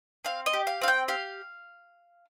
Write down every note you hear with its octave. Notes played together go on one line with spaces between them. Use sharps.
C4 F5
D#5
G4
F5
C4 F5
G5
G4 F5